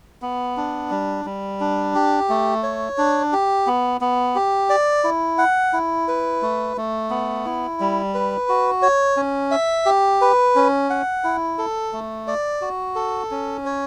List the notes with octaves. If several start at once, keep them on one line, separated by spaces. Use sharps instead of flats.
B3
D4
G3
G3
D4
G4
A3
C#5
D4
G4
B3
B3
G4
D5
E4
F#5
E4
B4
A3
A3
B3
E4
G3
B4
F#4
C#5
C#4
E5
G4
B4
C#4
F#5
E4
A4
A3
D5
F#4
A4
C#4
C#5